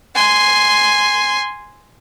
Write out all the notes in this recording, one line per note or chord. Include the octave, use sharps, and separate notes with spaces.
G#5 C6